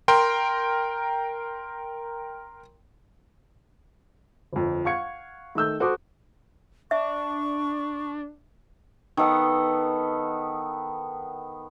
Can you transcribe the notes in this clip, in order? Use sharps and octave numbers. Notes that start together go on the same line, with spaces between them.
A#4 G5 C6
G1 F2
F5 F#5 C#6 G#6 C#7
D#3 A3 E6 G6
F#4 A4 C5 D6 D#6
D4 E5 C#6
D#3 B3 A4 F#5